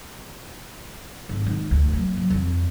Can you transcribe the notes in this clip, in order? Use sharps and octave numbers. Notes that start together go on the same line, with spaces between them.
G#1
D#3 G#3
D2
F#3 A#3
F#3
F2 E3